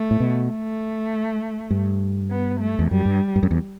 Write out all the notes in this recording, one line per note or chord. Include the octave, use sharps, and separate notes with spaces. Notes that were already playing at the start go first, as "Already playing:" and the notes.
Already playing: A3
A2
B2
A3
G2
B3
A3
E2
F#2 G3
G2
G2
F#2
E2